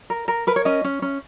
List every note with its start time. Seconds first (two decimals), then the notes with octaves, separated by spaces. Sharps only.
0.10 A#4
0.28 A#4
0.47 A#4 B4
0.56 C#5
0.65 C#4 D#5
0.84 C#4
1.02 C#4